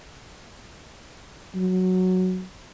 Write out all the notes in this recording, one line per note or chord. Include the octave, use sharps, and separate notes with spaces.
F#3